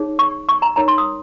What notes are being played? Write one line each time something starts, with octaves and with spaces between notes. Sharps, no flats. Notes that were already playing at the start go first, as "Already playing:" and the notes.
Already playing: D#4 G#4 C#5
C#6
C#6
A#5
D#4 A#4 C#5 A#5
C6
D#6